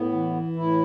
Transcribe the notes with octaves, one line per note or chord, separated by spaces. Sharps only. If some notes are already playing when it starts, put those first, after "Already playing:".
Already playing: A2 B3
E3
A2 E4